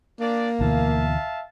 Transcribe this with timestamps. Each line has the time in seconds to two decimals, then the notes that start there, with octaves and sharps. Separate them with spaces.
0.20 A#3 D4 D5
0.61 D2 B2 E3 E5 F5 A5